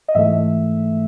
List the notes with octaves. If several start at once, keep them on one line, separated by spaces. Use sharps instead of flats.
D#5
G#2 E3 A3 E5